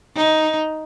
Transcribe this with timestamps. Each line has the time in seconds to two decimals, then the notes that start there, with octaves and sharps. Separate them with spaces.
0.16 D#4